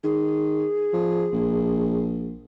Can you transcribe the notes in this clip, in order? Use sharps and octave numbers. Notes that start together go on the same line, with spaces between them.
D#3 G#4
F3
A#1